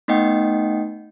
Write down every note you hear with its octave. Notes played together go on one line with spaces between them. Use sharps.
A3 B3 D#4 D#5 F#5 G5